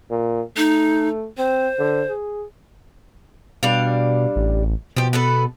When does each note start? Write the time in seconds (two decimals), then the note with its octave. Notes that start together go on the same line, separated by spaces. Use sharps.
0.10 A#2
0.57 A3 D#4
1.38 C4 C5
1.79 D3
2.09 G#4
3.63 B2 G3 D4 F5
4.36 A1
4.97 B2 F3 G4
5.13 B3 A4 B4